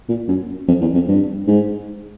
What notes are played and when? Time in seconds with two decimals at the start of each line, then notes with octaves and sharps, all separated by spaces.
0.08 A#2
0.28 F#2
0.68 F2
0.81 E2
0.94 F2
1.08 G2
1.47 G#2